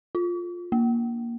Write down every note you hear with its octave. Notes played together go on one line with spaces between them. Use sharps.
F4
A#3